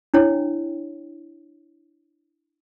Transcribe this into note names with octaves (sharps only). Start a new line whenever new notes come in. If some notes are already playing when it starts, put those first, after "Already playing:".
D4 E4 C#5 G5